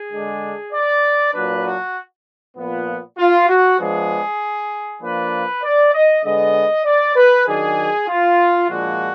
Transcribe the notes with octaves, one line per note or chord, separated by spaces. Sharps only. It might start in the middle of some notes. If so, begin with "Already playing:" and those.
Already playing: G#4
D3 G#3 D4
D5
A#2 F#3 D4 B4
F#4
A#2 F3 B3
F4
F#4
F3 G#3 B3 D4 G#4
F3 A#3 D4 B4
D5
D#5
D3 G#3 B3 D#5
D5
B4
D#3 F#3 D4 G#4
F4
A#2 F3 G#3 D4 F#4